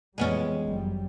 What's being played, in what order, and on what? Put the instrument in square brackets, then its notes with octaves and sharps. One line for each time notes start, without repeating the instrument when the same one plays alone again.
[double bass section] F2 E3 G3 [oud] G#3 B3 C#4
[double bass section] G1 F#2 G3